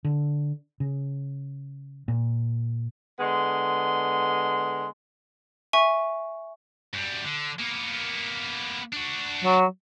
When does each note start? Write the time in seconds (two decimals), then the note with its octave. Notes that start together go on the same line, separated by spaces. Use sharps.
0.05 D3
0.80 C#3
2.08 A#2
3.20 D3 G#3 B3 C6
5.73 E5 G#5 C#6
6.93 F#2 G3
7.24 D3
7.59 A#3 B3
8.93 D4 F#4
9.44 F#3